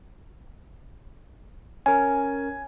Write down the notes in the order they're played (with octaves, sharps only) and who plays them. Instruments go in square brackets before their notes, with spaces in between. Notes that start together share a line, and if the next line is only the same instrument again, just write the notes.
[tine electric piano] C#4 A#4 [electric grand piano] G#5